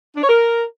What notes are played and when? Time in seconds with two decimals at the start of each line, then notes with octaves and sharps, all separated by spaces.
0.15 D4
0.22 C#5
0.29 A#4